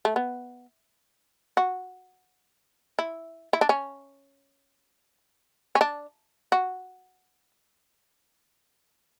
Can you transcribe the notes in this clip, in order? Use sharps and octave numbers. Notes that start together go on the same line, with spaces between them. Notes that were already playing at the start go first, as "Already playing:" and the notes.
A3
B3
F#4
E4
E4
D4
C#4
C#4
D4
F#4